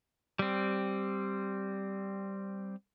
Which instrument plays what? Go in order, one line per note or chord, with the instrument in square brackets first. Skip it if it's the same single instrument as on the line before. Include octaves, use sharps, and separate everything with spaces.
[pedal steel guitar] G3 C4